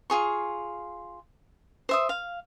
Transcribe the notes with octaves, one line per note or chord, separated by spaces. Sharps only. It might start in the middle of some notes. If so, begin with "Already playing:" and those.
F4 G#4 C#6
C5 E5 D#6
F5